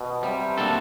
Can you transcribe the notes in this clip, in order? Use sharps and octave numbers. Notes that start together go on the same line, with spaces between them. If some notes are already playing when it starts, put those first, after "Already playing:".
Already playing: B2
C3 G3
A#3 D4 F#4 A4